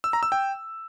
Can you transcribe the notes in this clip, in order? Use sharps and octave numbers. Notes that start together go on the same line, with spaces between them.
E6
A#5
E6
G5